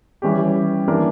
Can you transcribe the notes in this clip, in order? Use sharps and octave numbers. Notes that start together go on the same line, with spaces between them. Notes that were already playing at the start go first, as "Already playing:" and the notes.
E3 G3 C#4 G4
E3 A#3 D4 A#4